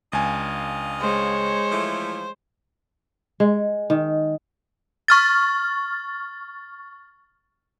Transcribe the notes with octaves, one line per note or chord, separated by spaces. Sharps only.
C#2 D4 D#5 F5 G#5
G#3 C5 C#5
E3 F3 A3
G#3
D#3
C#6 F6 A6